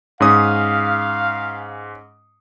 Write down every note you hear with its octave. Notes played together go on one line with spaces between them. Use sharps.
G#2 C#4 F5 D#6